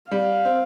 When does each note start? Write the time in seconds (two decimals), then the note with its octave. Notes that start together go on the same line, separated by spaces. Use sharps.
0.11 G3 F5
0.45 C4